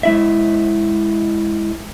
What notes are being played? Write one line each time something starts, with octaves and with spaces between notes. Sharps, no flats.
G#3 E4 E5